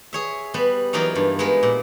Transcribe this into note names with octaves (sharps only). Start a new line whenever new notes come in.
G#4 C#5 E5
G3 B3 C5
E3 F#3 A#3 D#4 F4
G2
G#3 B3 A#4
A#2